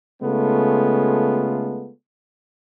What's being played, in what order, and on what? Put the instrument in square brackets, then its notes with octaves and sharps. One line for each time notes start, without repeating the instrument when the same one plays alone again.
[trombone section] C#3 G#3 A3 B3 F4 A4